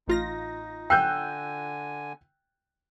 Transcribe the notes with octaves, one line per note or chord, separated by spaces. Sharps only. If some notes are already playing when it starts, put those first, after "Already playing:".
A1 D#4 F4 A#6
D3 G5 G#5 E6 F#6 G6